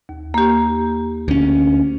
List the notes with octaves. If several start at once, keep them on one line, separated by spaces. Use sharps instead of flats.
D#2
A#3 G4
D2 C#4